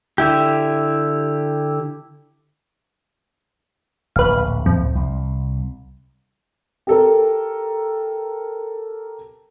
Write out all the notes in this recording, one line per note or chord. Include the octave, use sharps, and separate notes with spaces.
D3 E4 G4
D1 A#1 B4 F5
F2
C2
G4 A4 A#4